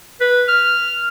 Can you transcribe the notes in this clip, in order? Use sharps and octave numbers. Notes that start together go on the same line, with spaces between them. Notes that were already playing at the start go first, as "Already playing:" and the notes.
B4
F6